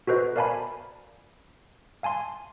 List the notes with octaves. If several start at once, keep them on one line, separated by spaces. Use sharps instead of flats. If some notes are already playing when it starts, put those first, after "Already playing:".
F#4 A4 B4 C5 D#5
A#4 D5 F5 G#5 A5 B5
F5 G#5 A5 C6